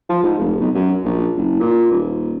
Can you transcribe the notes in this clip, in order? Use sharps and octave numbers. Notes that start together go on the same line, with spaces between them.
F3
G#2
F1
B1
F#2
A#1
F#1
A#2
D#1